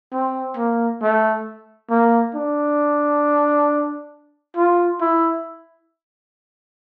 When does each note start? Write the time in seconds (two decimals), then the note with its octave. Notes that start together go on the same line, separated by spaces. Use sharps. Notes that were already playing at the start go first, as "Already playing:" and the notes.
0.12 C4
0.57 A#3
1.02 A3
1.90 A#3
2.35 D4
4.57 F4
5.01 E4